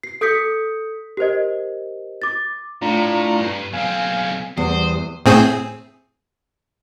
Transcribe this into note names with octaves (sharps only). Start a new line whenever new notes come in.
C7
A4 D#6 G6 B6 C#7
G4 A#4 C5 D#5
D6 A6
A2 D4 F4 A#5
G2
B1 C4 F5 G#5
E2 G3 C5 D#6
A2 C4 G#4